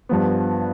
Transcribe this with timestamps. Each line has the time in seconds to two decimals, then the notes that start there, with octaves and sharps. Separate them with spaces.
0.09 G2 F3 B3